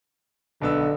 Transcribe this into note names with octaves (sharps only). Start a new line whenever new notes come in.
B1 D3 B3 E6